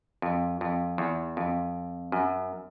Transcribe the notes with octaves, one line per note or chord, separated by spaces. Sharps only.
F2
F2
E2
F2
F#2